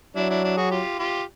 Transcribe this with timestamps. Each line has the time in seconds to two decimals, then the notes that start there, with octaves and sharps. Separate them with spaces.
0.16 F#3 D4 E4
0.30 D4 E4
0.44 D4 E4
0.57 F#4 G#4
0.71 F4 G4
0.99 F4 G4